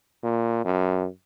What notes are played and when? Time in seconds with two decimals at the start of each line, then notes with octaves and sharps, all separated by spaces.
0.23 A#2
0.64 F#2